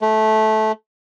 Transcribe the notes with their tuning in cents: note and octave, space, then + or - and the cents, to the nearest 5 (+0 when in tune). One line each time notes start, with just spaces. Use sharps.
A3 -15